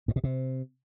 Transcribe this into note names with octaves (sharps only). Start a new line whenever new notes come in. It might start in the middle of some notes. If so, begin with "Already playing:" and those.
G2
B2
C3